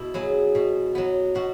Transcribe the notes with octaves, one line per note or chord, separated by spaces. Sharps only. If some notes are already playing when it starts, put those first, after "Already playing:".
Already playing: B2 E4
F#3 B3 G#4
B2
F#3 B3
B2 F#4